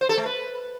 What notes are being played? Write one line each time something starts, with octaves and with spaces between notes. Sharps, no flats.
C5
A4
A3
B4